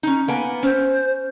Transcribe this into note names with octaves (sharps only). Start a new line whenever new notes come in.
C#4 D#4
A#3 B3 G#5
C#4 C5